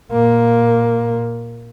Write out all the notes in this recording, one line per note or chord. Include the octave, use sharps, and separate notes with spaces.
A#2 A#3